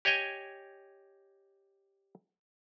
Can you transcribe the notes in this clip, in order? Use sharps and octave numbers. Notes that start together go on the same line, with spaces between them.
G4 C#5 D#5 G5 G#5